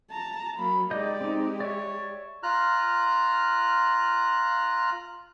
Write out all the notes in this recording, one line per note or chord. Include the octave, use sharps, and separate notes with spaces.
A5 A#5
F#3 A#3 B5
G#3 D#4 G4 D5 D#5 G6
C4 D#4
C#5 D5 E5
F4 A#5 F6 F#6